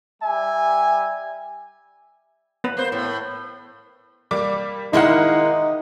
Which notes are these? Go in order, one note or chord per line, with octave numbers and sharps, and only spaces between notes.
G3 E5 G#5
B3 B4
A#3 C5
A2
G3 A#3 D6
D#3 G#3 A#3 D#4 E4 F#5